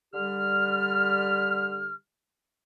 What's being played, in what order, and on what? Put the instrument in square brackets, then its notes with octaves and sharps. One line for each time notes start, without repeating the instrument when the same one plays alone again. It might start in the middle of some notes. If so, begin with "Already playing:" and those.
[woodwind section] D3 G3 G4 F6